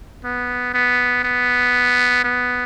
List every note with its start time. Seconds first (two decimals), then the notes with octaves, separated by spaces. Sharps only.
0.24 B3
0.74 B3
1.24 B3
2.24 B3